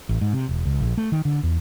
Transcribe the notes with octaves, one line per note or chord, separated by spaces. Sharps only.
A1
G#2
C3
E1
C#2
A#1
A3
D#3
D3
E2